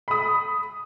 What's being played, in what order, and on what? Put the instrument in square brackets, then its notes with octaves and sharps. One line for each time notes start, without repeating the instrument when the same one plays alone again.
[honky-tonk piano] B5 D#6